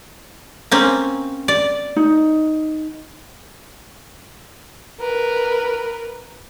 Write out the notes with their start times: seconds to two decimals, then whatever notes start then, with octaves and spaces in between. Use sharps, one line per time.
0.71 A#3 C4 C#4
1.48 D5
1.96 D#4
5.00 A#4 B4